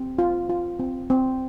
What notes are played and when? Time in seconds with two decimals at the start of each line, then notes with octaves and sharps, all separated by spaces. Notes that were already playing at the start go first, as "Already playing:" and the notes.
Already playing: C4
0.18 F4
0.49 F4
0.79 C4
1.10 C4